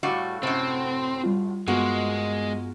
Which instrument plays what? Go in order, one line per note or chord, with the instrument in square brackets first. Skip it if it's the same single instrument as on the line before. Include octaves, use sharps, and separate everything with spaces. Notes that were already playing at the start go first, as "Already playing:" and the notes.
[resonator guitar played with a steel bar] A2 G3 F#4 [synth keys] F5 C#6 E6
[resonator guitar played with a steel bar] F#2 A2 [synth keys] C3 F#5 [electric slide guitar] C4
[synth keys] G3 F4
[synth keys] G2 B3 F4 [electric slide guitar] G#3 [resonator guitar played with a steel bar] A#3 F#4